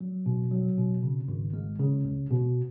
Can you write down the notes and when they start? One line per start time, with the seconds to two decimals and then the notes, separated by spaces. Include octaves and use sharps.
0.01 F#3
0.26 B2
0.51 F#3
0.78 B2
1.03 C#3
1.28 G#1
1.53 G#3
1.79 C#3
2.05 C#2
2.31 B2